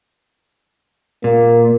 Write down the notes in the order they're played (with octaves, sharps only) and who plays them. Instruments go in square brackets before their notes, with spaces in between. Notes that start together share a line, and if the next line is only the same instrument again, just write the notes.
[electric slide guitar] A#2 [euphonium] A#3